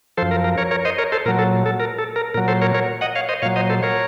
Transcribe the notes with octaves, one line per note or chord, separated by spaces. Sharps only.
F#2 F3 A4 C5
A#4
A#4
A#4 C#5
A#4 C#5
C5 D#5
A#4 C#5
A4 C5
A#2 F#3 A#4
A4
A4
A#4
A4
A#4
A#2 F#3 A#4
A4 C5
A#4 C#5
A#4 C#5
D#5 F#5
C#5 F5
C5 D#5
A#2 F#3 C#5 F5
C5 D#5
A4 C5
A#4 C#5